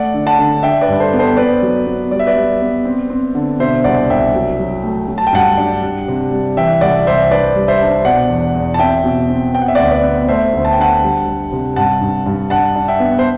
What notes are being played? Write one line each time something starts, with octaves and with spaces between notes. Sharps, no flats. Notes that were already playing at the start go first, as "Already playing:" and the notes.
Already playing: A3 D5 F#5
D3
F#5 A5
D3
D4 E5 G5
B4 D5
G2
A4 C5
B3
A4 C5
B3 B4 D5
F#3
B3
G3 D5
E5
B4 D5
G3
B3
C4
C4
D3
B2 C5 E5
C2 D5 F#5
C2 E5 G5
F#3
F#3
A3
F#3
A5
G5
G2 F#5 A5
D4
G3
C3
G3
E3 E5 G5
C2 D5 F#5
C2 C5 E5
D4 B4 D5
G3
C5 E5
D4
B2 D5 F#5
E2
E2
A5
C4 E5 G5
B2
C4
B3 G5
F#5
E5
D2 D5 F#5
B4 D5
B3
A3 C5 E5
D2
A5
G5
D3 F#5 A5
G3
G3
C3
G2 F#5 A5
G2
G2
D4 F#5 A5
D4
E5 G5
B3
C5